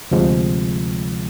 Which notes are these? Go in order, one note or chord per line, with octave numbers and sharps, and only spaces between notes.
D2 C3 F3 G#3